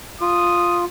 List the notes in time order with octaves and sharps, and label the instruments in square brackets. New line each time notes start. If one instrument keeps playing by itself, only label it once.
[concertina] F4 [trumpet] D#6